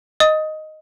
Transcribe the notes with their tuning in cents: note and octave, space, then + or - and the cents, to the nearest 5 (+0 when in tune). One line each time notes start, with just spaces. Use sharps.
D#5 +0 D#6 +15